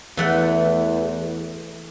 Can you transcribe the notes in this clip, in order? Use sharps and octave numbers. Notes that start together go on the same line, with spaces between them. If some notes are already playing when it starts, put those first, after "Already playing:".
E2 E3 A3 F#5